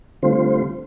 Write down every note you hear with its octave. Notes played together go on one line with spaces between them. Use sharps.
D3 G3 A3 C4 F4 C5